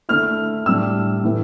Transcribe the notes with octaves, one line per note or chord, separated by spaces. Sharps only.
D3 A3 E4 F6
A2 G3 D4 E6
A2 E3 A3